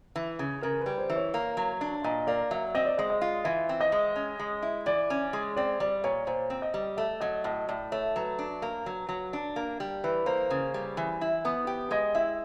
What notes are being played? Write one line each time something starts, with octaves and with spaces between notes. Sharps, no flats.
E3
C#3
C#3 A#4
B4
G3
C5
E3
C#5
A#3
F#3
D4
A#2 D#5
A#3 D5
F#3 E5
C4 D#5
D5
G#3 D#5
D#5
F4
E3 E5
C4
D#5
G#3
C#4
G#3
E4
E3 D5
C#4
G#3
C4 D5
G3 D5
A#2 C#5
A#2 C5
C4
D#5
G3
A3 E5
F#3 D#5
A2 D#5
A2 D5
A3 C#5
F#3 B4
D4
A#3
F#3
F#3
D4
A#3
G3
E3 B4
A#3 C5
C#3
G3
E3
E4
B3
G4
G#3 D#5
E4 E5